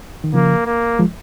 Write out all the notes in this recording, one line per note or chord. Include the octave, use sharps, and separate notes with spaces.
D#3
C#3 F3 A#3
A#3
F3 G#3